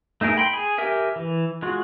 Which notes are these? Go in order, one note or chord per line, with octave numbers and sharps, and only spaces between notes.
A3 D#4 G#4 A#4
G5 B5 C6
G#4
G4 A#4 E5 G#5
E3
G#3 F4 F#4